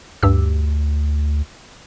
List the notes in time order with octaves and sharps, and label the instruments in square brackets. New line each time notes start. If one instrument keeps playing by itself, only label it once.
[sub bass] D2 [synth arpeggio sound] G2 G4 E6